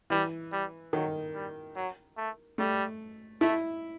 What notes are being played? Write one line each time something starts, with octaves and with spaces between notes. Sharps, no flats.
E3 G3
G3
D#3 F#3
G3
F#3
A3
G3 A3
A3 E4